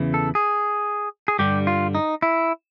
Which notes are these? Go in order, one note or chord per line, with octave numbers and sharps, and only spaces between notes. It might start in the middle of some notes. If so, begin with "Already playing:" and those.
Already playing: E2 C#3 E3
A4
G#4
G#4
G2 D3 G3 G4
F4
D#4
E4